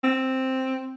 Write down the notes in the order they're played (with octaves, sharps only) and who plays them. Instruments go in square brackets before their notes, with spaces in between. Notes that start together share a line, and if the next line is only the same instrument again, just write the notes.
[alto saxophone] C4